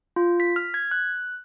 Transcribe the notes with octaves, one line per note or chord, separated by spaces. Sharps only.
F4
B6
F6
G#6
F#6